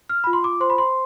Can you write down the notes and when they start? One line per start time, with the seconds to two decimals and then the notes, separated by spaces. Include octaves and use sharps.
0.09 F6
0.24 F4 B5
0.33 C6
0.44 D6
0.60 C5 C6
0.70 B5
0.78 C6